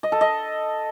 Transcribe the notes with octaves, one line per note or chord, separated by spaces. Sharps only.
D#5
A4
D#5